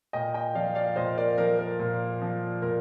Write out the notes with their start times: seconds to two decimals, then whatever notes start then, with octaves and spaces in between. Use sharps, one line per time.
0.13 A#2 D#5 G5
0.34 D#5 G5
0.55 F3 D5 F5
0.75 D5 F5
0.96 A#2 C5 D#5
1.17 A#4 D5
1.38 F3 A#4
1.59 A#4
1.79 A#2
2.21 F3
2.62 A#2 A#4